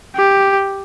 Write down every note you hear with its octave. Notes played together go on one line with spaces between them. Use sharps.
G4